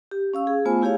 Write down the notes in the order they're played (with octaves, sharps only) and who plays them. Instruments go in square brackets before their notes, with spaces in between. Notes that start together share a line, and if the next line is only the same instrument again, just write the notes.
[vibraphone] G4
C#4 F5 E6
G#4
A3 B3 F4 C5 G#5
A3 E4 G4 G#4 C#5 F5